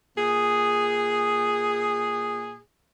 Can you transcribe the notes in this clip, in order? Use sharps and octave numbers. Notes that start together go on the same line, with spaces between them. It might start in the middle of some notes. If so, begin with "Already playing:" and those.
A#2 G#4